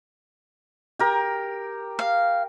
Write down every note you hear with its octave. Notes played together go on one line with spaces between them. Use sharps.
G4 A#4
F5